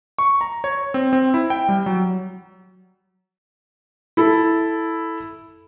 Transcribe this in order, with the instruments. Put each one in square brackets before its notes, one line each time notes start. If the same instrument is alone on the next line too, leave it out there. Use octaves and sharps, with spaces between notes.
[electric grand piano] C#6
A#5
C#5
C4
C4
E4
G5
G3
F#3
[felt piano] E4 A4